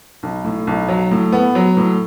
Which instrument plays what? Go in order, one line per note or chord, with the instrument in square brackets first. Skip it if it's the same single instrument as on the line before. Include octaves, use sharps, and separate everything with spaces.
[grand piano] B1
A2
B1
F#3
A2
B3
F#3
A2